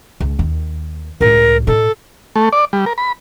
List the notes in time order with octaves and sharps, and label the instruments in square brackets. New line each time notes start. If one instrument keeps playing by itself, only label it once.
[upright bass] C#2
D#2 D#3
[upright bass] C#2 A2 [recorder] A#4
[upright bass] A2 D#4 [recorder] A4
[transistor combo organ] A3
D5
G3
A#4
B5